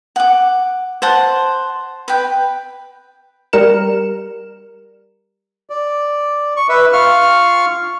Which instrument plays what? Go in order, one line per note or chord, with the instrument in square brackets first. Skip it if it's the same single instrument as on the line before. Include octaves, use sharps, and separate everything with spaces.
[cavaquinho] F#5 D6
C5 F#5 A5
B4 G5
[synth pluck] G3 A#4 C#7 E7
[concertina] D5
C#6
B4 E5
F4 F5 C#6 F6